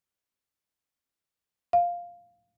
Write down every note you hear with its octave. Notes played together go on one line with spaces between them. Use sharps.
F5